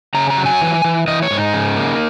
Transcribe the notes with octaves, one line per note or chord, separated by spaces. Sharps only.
C#3 A#5
A#5
F#3
G#5
E3
E3
E3 D#5
C#5
G#2
D#4
C#3
A#3